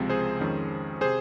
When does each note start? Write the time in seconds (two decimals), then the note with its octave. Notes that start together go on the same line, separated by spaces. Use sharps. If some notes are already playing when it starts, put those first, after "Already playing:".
Already playing: C#2 C3 F3 G#3 C4
0.10 G#4 C5
0.40 F2 D#3 G#3 C#4
1.01 C3 G#4 C5